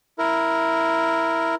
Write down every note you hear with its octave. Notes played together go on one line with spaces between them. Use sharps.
E4 A#4